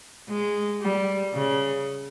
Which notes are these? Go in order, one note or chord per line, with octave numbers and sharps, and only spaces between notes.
G#3
G3
C#3